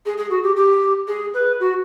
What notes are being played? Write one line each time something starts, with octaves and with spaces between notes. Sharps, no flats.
G#4
G#4
F#4
G4
G4
G#4
B4
F#4